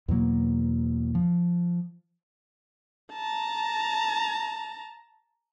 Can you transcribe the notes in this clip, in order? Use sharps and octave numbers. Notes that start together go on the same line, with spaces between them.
E2 B2 F#3 A#3
F3
A5 A#5